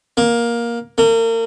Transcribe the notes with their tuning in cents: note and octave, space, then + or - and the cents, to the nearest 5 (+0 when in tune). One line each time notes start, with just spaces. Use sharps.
A#3 +15
A#3 -35